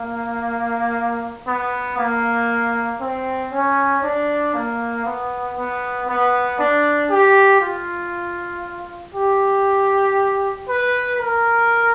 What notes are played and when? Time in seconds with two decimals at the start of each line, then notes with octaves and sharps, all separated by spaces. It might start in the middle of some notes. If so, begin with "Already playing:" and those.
Already playing: A#3
1.47 B3
1.98 A#3
3.00 C4
3.52 C#4
4.03 D4
4.54 A#3
5.05 B3
5.57 B3
6.08 B3
6.59 D4
7.10 G4
7.61 F4
9.14 G4
10.68 B4
11.20 A#4